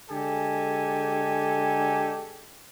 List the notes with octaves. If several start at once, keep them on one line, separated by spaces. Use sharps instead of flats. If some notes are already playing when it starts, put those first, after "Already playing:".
D3 G#3 G4 A4 G#5